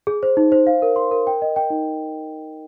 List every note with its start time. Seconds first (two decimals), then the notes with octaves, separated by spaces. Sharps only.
0.07 G#4
0.23 C5
0.37 D#4
0.52 C5
0.67 F5
0.82 A#4
0.96 C6
1.11 A#4
1.27 G5
1.42 D#5
1.56 G5
1.70 D#4